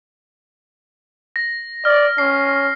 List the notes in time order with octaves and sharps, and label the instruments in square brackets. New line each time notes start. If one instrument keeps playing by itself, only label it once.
[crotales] A#6
[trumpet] D5 [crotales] F6
[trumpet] C#4 [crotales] C7